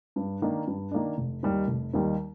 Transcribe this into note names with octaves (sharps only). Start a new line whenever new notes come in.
G2
D#3 A#3 D4
G2
D#3 A#3 D4
F1
D#2 D#3 G3
F1
D#2 D#3 G3